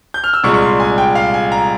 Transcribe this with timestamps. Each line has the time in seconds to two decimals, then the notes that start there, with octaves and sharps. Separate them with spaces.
0.14 G6
0.24 F6
0.34 E6
0.44 C2 A#2 G#3 C#6
0.54 C#6
0.62 C6
0.80 G#5
0.98 G5
1.15 F5
1.34 G#5
1.52 A#5